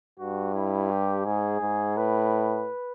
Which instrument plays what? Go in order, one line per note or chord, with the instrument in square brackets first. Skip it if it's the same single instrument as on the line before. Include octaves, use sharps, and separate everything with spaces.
[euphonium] G2 [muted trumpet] F#4
[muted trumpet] E4
G4
[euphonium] G#2 [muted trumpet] G#4
[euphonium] G#2
[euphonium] A2 [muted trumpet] B4